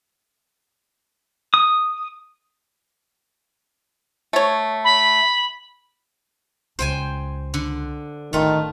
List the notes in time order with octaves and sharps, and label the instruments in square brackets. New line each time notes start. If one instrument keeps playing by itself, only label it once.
[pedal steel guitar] D#6
[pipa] A3 C#5
[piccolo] B5
[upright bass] C#2 [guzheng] C5 G5 G#5
[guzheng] D3
[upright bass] A1 [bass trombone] D#3 [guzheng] A3 F4